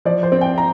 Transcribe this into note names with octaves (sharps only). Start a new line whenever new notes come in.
F3 D5
C5
C4
G5
A#5